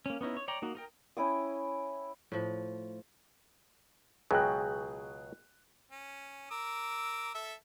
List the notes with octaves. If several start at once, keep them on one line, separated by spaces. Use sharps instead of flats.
A#3 C#4
B3 C#4 D#4 E4
C#5
C#5 D5 G5 A#5
A#3 D#4 F#4
D#4 A#4 G5
C#4 E4 G5 D#6
A2 F3
C#2 B2 F#3 G#4 G5 F#6
C#4
A#4 D6 E6
A4 E5